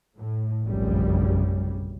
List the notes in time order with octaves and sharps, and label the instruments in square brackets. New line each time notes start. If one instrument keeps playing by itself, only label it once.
[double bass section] A2
F1 A#1 F#2 C#3 G3